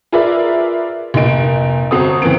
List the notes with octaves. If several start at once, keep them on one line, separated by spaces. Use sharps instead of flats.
F4 G#4 A#4 B4 D5 E5
F1 A#2 D#4 D7
G1 C4 F#4 A4 D#6
C#2 E3 B3 C4 D7